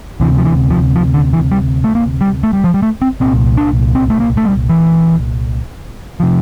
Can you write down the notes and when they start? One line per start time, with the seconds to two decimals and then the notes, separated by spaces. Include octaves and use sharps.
0.20 D2 C3 E3
0.38 F3
0.45 E3
0.70 F3
0.96 F3
1.14 D3
1.33 E3
1.52 G3
1.84 A3
1.95 A#3
2.21 G3
2.43 A3
2.53 G3
2.64 F3
2.74 G3
2.82 A3
3.02 C4
3.20 C2 A#2 C4
3.57 D4
3.95 C4
4.10 A3
4.20 A#3
4.37 A3
4.45 G3
4.70 E3
6.20 C3 F3